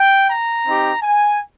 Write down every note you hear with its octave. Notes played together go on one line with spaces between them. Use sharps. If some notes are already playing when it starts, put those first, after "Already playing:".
Already playing: G5
A#5
C4 D#4 G4
G#5